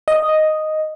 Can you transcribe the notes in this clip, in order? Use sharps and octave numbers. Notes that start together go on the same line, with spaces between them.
D#5